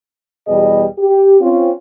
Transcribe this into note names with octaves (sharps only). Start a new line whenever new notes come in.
E2 B2 G3 G4 G#4 D#5
G4
C4 C#4 F4